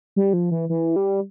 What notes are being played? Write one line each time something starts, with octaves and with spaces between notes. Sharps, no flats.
G3
F3
E3
E3
G3